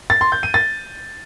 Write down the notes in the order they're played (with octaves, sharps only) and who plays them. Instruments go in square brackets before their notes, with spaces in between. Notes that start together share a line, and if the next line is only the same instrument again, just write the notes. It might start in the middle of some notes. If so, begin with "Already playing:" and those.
[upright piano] A6
C6
G6
D#7
A6